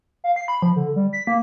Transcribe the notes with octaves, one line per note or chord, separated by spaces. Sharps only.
F5
C7
B5
F3
D3
G3
B6
A#3